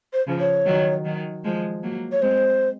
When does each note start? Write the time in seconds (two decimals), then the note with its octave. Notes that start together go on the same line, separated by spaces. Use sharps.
0.13 C5
0.27 C#3 F3
0.40 C#5
0.66 D#3 F#3
1.05 D#3 F#3
1.44 F3 G#3
1.83 F#3 A#3
2.12 C#5
2.22 G#3 C4 C5